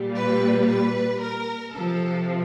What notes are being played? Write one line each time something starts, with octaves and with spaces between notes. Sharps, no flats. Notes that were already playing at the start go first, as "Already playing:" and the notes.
Already playing: A#2 G3
B4
B4
A#4
C3 F3 A4